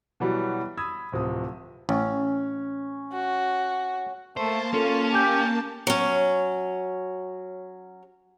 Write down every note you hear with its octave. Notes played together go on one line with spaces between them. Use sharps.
B2 E3 F#3 G3
B5 D#6 E6 G#6
D1 C3 F3 D#6
A1 C#4
F#4
A3 A#3 C5 A5
C#4 F4 A4
G4 G#5 G6
F#3 C#4